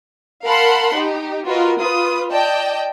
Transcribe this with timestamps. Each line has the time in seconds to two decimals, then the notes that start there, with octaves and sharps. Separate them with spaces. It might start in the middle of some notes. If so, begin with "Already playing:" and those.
0.44 A#4 F5 F#5 A5 B5 C6
0.94 D#4 G4
1.47 F4 F#4 A#4 B4 D#5
1.79 F4 B4 D#6
2.30 D5 D#5 G5 A5